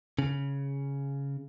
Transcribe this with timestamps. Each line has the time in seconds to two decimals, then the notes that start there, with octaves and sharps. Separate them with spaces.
0.19 C#3